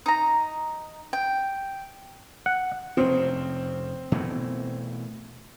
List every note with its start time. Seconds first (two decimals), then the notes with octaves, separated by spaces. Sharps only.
0.06 D#4 A#5
1.13 G5
2.46 F#5
2.97 F1 C#3 C4
4.12 B2 E3 A3